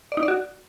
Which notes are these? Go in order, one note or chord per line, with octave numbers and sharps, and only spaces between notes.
D5
D#4
D5
F#4